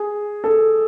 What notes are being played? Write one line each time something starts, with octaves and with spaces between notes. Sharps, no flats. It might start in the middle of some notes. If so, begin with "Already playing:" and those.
Already playing: G#4
A4